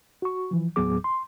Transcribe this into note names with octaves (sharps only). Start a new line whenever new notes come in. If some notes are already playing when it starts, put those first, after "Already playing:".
F#4 C#6
E3 F3
D#2 A2 F#3 B3 G#4 D6
C6